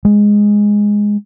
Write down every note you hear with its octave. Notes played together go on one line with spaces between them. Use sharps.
G#3